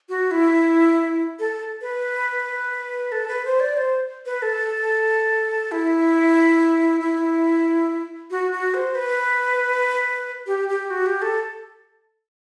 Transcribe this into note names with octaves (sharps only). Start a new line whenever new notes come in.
F#4
E4
A4
B4
A4
B4
C5
D5
C5
B4
A4
E4
E4
F#4
F#4
C5
B4
G4
G4
F#4
G4
A4